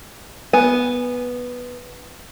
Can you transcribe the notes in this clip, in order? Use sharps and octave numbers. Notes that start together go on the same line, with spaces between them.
B3 G#5